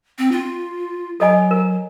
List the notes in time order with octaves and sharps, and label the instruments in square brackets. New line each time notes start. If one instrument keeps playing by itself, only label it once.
[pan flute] C4
F4
[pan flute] F#3 [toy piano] A4 D#5 G#5
[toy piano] A#4